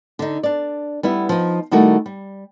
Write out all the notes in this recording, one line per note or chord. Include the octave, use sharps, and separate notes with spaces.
D3 D#4
D4 D5
G3 B3 E4
F3 D#4
D#3 G3 A3 E4 F#4 A#4
G3